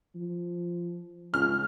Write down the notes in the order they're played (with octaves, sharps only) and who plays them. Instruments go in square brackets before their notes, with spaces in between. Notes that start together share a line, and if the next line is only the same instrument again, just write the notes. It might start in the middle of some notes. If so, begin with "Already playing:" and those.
[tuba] F3
[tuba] C#2 [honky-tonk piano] F6